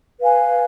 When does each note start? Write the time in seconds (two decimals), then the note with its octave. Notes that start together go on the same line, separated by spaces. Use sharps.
0.21 B4 F5 G#5